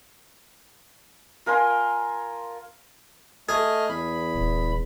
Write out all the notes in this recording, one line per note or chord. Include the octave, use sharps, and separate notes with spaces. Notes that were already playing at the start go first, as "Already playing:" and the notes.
F4 A#4 G#5 C6
A3 G#4 D#5 F6
E2 B5
D#1